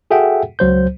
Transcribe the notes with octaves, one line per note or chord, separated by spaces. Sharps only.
F#4 G#4 A4 E5 F#5 G5
C#2 F#3 C5 G6